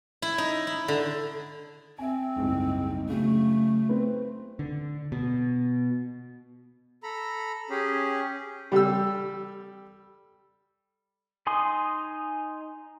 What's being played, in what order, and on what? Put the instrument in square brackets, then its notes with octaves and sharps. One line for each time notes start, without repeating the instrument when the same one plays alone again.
[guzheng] E4
D#4
E4
D3
[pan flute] C4 [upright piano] E5 G#5
[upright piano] F#1 C2 G#2
[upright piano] C#3 F#3 [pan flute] A3
[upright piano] C4 B4
[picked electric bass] D3
B2
[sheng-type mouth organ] A4 A#5 B5
C#4 G4 G#4
[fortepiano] G3 G4 A4 E6
[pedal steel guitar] D#4 G#5 C6 D#6